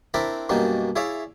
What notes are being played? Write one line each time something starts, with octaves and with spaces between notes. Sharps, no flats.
C4 D4 E4 A#4 D5 B5
F#2 B2 G3 A#3 D4 D#4
E4 G#4 C#5 D5 E5 F5